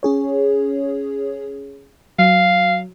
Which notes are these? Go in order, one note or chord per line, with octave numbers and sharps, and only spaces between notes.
C#4 G#4 C#5
F#3 F5